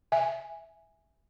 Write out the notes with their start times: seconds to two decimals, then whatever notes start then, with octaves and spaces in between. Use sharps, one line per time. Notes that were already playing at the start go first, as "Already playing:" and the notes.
0.12 E5 G#5